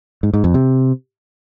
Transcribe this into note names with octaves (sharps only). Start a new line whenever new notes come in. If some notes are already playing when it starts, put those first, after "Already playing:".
G#2
G#2
F2
C3